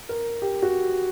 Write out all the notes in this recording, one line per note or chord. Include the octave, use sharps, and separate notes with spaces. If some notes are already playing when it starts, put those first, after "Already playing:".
A#4
G4
F#4